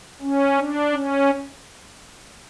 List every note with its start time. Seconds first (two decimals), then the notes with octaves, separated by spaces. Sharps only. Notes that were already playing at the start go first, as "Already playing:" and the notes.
0.22 C#4
0.57 D4
0.93 C#4